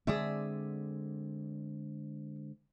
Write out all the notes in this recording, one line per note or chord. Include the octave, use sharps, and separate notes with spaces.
D3 G#3 C4 G#4 D5 E5